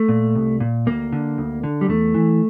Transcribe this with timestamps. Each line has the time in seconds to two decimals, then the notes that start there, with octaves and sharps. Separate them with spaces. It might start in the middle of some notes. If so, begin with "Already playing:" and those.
Already playing: A3
0.09 A#2
0.35 C2
0.60 A#2
0.86 D2 A#3
1.12 D3
1.38 D2
1.64 D3
1.81 G3
1.89 E2 A3
2.14 E3